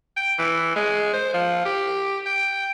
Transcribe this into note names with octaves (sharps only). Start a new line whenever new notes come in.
G5
E3
G#3
C5
F3
G4
G5